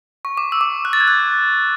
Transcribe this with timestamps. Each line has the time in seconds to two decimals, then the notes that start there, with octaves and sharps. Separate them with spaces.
0.25 C#6
0.37 D6
0.52 E6
0.61 D6
0.85 F#6
0.93 A6
1.00 G#6
1.08 F#6